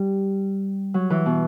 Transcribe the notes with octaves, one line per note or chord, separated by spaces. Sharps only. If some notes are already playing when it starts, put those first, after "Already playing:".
Already playing: G3
F#3
E3
B2